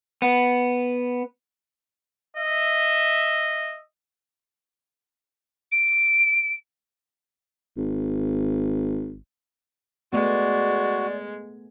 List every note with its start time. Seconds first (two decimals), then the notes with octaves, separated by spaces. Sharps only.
0.22 B3
2.37 D#5 E5
5.72 D7
7.77 G#1
10.13 G#3 A3 B3 F#4 D5